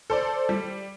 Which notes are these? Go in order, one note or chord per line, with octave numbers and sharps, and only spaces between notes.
A4 C5 D5
G3